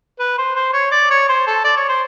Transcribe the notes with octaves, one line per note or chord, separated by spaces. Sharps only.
B4
C5
C5
C#5
D5
C#5
C5
A4
D5
C#5
C5